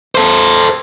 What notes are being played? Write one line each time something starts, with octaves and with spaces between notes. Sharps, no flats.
A4 C5